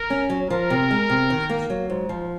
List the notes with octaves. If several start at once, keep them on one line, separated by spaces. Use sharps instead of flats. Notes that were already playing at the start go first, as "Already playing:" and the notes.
Already playing: A#4
C#4
F#3
F3 A#4
C3
G#3
C3
D#3
A#3
F#3
G#2
F3